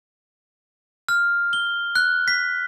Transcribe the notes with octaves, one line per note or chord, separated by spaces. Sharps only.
F6
G7
F#6
B6